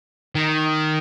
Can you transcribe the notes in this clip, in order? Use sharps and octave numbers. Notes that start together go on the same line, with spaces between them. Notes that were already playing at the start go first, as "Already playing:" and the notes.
D#3